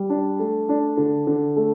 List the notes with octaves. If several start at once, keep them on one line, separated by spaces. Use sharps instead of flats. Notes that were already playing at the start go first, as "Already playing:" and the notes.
Already playing: G3
D4
A3
D4
D3
D3
A3